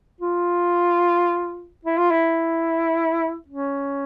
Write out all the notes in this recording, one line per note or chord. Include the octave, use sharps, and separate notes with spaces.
F4
E4
F4
E4
C#4